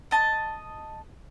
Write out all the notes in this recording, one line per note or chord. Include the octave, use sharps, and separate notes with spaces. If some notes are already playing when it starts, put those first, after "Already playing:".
D#5 A5